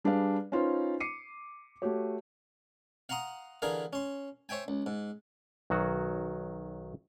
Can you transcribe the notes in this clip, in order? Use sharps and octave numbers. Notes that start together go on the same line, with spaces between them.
G3 D4 G#4 B4 D5 F5
C#4 D#4 F4 B4 C5
D6 C7 C#7 D#7
A3 F#4 G4 C#5
F5 F#5 A#5 C6 D#6
D3 E3 G#4 A#4 F5
C#4 C6
C5 C#5 E5 G5 G#5
C#2
G#2
B1 D#3 F#3 F#4